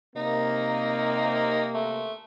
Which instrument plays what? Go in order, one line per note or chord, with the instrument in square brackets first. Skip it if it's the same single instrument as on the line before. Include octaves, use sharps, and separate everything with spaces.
[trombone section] C3 A#3 [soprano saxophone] D#4
[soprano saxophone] A3